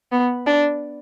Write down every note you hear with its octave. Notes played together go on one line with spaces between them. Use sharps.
B3
D4